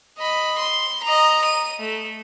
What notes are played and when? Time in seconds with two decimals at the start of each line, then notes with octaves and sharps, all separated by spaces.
0.19 D#5 B5
0.59 C6
1.04 D#5 A#5
1.45 D#7
1.79 A3